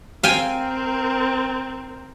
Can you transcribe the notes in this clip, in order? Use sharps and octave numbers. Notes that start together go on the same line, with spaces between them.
C4 A#4 F5 G5 G#5